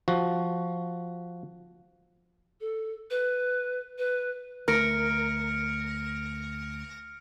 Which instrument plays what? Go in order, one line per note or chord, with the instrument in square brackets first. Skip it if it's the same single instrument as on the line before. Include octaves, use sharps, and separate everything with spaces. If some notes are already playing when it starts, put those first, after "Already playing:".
[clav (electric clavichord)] F3 F#4
[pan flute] A4
B4
B4
[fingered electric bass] D2 A3 [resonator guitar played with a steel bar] A#4 [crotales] F6 C#7 D7